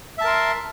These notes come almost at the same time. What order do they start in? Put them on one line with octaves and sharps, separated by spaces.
E5 A5 A#4 C6